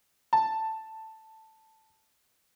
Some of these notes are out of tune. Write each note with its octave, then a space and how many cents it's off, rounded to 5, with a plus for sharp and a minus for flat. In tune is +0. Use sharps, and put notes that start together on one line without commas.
A5 +5